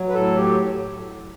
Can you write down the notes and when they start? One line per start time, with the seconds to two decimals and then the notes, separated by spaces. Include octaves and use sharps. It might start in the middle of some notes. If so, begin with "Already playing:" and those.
Already playing: F#3
0.09 B4
0.14 A2 A4
0.37 F#3 G4